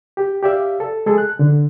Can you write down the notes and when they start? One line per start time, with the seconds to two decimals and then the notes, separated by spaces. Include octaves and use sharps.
0.17 G4
0.43 G4 D5 E5 F5
0.80 A4
1.06 G#3 G#4 A4
1.18 F#6
1.39 D3